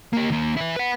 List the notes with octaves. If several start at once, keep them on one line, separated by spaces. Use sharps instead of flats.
A#3 G4
D#2 A#3
E4 B4
B4 F#5